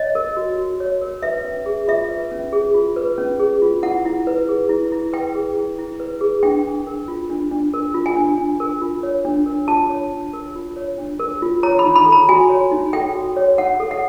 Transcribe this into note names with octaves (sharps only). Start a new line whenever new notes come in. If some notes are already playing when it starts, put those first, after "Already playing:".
Already playing: C#5 D#5
A#4
F#4
F#4
C#5
A#4
B4 E5
C#4
G#4
F4 E5
B4
C#4
G#4
F4
B4
C#4
G#4
F4
E4 F#5
E4
B4
G#4
E4
E4
B4 G5
G#4
E4
E4
B4
G#4
D4 G5
D4
A#4
F4
D4
D4
A#4
F4
G#5
D4
D4
A#4
F4
C#5
D4
A#4
F4 A5
C#5
D4
A#4
F4
C#5
D4
A#4
F4
C#5 A#5
B5
D#4
B5
A4
A#5
F#4 G#5
C#5
D#4
A4 G5
F#4
C#5
D#4 F#5
A4
F#5